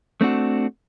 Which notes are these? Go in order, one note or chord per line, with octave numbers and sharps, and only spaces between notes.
A3 C4 D4 F#4